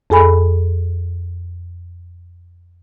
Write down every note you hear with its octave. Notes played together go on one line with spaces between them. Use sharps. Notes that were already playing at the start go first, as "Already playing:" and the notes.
F2 G#4 A4 G#5 B5